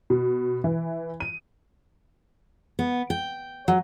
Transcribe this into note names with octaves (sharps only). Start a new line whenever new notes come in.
B2
E3
D#7
B3
G5
F#3